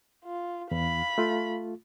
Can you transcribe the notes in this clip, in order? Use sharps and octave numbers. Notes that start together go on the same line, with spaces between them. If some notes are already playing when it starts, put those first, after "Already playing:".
F4
E2 F5 B5
A3 F4